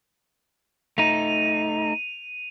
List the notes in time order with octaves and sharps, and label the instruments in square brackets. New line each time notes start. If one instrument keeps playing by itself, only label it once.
[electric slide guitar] A3 D#4 [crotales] D#7 F7